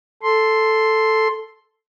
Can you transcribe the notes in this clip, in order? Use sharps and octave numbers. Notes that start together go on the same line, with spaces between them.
A4 C6